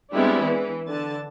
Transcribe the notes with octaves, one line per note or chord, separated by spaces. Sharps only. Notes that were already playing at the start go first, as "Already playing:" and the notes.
G3 G#3 B3 C4 D4 E4
E3
D3 A5